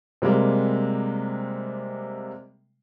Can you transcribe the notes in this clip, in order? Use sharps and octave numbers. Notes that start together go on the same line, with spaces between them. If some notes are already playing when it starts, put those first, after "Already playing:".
C3 G3 G#3 A#3